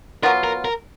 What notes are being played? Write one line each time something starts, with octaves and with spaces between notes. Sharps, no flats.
F#3 B3 F4 A#4
A#4
A#4